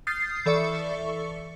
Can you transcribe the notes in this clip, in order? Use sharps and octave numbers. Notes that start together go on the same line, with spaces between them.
D#6 F6 G6 A6 C7
E3 A4 D5 E5 C#6 C#7